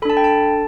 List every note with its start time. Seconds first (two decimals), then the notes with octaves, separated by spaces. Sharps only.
0.02 A4 B5
0.05 D4 A5
0.17 G5
0.24 A5